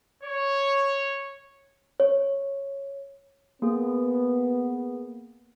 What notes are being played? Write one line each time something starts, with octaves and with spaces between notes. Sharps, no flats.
C#5
C#5
A#3 B3 G#4